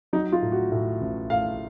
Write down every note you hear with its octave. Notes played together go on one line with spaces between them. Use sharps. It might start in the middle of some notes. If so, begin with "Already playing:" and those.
F#3 D#4
F4
A2
F#4
A2
A1
A2 F5